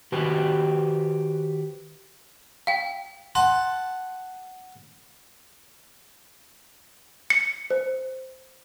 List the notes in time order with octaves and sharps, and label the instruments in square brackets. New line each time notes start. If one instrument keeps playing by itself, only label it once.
[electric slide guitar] D#3 F#4 G4 B4 C5
[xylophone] F5 G5
[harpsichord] F#5 A5 [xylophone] C6
[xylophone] C#7
C5